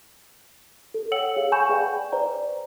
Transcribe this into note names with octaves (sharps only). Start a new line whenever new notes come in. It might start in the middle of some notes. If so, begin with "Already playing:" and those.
A4
C#5 F#5 G5 E6 C#7 F#7
G#4 C#5 F5
F#5 G#5 B5 C#6 G6 E7
G#4 B4 D5 F5 G5 G#5
B4 C5 D5 A#5